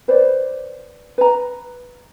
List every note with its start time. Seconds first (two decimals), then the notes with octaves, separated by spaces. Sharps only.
0.08 B4 C5 D5
1.18 B4 A#5